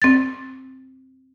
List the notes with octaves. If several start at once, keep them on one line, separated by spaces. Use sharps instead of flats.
C4 A6